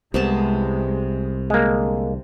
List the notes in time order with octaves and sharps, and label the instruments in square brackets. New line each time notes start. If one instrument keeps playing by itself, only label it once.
[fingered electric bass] C2 [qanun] C3 B3 A5 [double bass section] G#3
[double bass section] D3 [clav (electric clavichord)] G#3 A#3